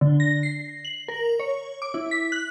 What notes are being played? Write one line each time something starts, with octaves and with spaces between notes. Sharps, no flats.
D3
A#6
C7
F#7
A#4
C#5
D6
E4
B6
F#6